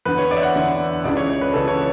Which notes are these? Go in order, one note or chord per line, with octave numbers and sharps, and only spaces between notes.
E2 D3 B4
C#5
D5
E5
F#5
E2 D3
C#2 C#3 E3 D5
C#5
C#5
B4
C#2 C#3 E3 A4
C#5